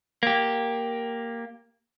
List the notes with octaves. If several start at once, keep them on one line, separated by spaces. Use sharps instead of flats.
A#3 G4